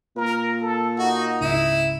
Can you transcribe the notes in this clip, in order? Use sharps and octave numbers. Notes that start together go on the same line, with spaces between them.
A#2 A#4
A4
D#4 F#4
C#2 G#2 C#3 E4